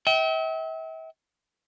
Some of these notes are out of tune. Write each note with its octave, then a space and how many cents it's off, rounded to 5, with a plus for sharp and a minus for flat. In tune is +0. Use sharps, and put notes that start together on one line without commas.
E5 -40 G5 -30